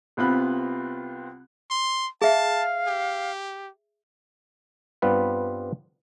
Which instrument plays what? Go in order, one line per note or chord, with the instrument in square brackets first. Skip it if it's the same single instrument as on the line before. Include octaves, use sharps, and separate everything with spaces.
[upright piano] C2 B3 C4 F4 B5 F#6
[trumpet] C6
[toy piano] G#4 E5 [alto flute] F5 [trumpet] A5
[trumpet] G4
[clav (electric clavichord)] G2 G3 B3 C4 F4 B4